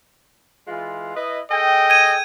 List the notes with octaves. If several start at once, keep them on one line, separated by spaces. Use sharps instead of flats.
E3 G#3 F4
E4 B4 D#5
G#4 A4 D#5 G5
G#6 D#7